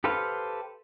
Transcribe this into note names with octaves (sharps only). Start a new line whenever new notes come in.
G4 A4 B4 C5 F5